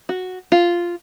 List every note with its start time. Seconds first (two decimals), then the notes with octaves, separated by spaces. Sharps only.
0.09 F#4
0.52 F4